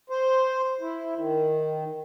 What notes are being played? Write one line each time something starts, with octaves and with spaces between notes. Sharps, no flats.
C5
E4
D#3